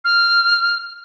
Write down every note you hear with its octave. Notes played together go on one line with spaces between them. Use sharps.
F6